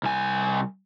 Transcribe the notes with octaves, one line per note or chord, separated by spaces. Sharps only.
C2 G#5